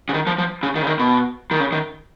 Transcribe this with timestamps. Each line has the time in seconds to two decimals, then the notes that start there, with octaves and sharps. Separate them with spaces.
0.09 C#3
0.14 D#3
0.27 F3
0.38 F3
0.63 C#3
0.75 D#3
0.82 C#3
0.87 D#3
0.99 B2
1.51 D#3
1.60 C#3
1.72 D#3